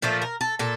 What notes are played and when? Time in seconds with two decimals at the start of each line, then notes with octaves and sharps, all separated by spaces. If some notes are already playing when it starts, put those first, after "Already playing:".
0.02 A#2 F3 A3 A4
0.22 A#4
0.41 A4
0.59 A#2 A4